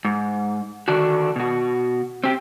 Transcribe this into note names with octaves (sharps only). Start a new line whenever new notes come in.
G#2
D3 D#3 D4 F#4
B2 F#4
C4 G4